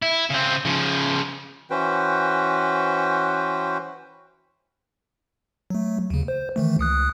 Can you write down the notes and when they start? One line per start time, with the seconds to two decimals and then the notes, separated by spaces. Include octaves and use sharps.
0.02 E4
0.30 C#3 C4
0.65 C#3 F3
1.70 E3 C#4 F#4 B4 C5 G5
5.70 F#3 A3
6.10 D#2 C#3
6.28 C5
6.56 D#3 E3 A3
6.79 C#2 D#6 F#6